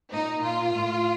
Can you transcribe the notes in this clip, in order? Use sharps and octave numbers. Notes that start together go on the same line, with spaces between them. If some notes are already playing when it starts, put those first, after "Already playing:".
A#2 D#4
A#2 F4
A2